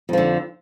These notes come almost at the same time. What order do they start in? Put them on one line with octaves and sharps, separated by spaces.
F2 F3 D3